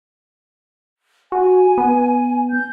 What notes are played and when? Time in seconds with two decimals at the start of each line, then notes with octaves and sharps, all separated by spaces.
1.32 F#4 G#5
1.78 B3
2.52 G6